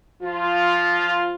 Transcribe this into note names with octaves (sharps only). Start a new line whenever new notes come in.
F3 F4